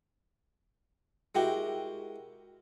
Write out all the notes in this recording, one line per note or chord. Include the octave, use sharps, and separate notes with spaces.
G#3 E4 F#4 G4 A#4 G5